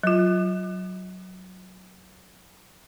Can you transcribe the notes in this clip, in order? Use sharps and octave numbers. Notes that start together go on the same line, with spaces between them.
F#3 F4